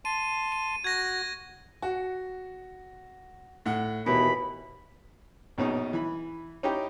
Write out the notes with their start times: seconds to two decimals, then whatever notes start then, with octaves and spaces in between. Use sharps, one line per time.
0.05 A5 C6 D#7
0.52 D#7
0.84 F#4 G#6 A#6
1.82 F#4
3.66 A2 F#5
4.06 D#2 B2 E3 B5
5.58 A#1 B2 C#4 D#4
5.93 E3 B5
6.63 C#4 D#4 E4 G4 G5